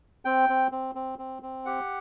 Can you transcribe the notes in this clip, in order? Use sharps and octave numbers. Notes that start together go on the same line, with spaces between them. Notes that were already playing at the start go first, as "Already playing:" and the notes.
C4 G5
C4
C4
C4
C4
C4
G4 F#5